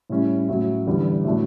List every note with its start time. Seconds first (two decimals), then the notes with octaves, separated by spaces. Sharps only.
0.10 A2 G3 C#4 E4
0.48 A2 F#3 C#4 E4
0.87 E2 D3 G3
1.25 A2 F#3 A3 D4